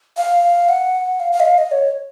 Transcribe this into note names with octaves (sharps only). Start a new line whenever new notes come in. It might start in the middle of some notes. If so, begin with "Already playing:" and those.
F5
F#5
F5
F5
D#5
F5
D#5
C#5